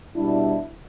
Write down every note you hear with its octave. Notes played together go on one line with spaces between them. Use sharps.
B2 G3 D4 E4